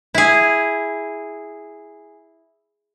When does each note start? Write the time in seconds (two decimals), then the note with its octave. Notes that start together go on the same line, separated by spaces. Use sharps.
0.14 E4 G#4